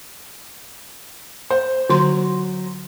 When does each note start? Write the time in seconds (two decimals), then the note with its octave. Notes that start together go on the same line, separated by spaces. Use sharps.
1.51 C5
1.90 D3 F#3 C6